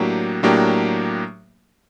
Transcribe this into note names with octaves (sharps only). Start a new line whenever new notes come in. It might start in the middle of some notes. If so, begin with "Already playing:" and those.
Already playing: A2 F#3 A#3 D4 G4
A2 F#3 A#3 D4 G4